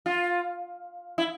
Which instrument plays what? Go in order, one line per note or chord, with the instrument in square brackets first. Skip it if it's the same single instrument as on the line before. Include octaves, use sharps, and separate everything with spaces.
[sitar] F4
E4